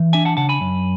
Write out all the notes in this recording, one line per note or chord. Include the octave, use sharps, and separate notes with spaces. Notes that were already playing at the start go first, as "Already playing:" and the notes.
Already playing: E3
D4 E5 G#5
F#5 A5
C#3 F#5 A5
G#5 B5
F#2